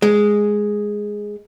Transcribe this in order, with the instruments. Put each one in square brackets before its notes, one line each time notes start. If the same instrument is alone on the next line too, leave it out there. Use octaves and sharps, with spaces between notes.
[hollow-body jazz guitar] G#3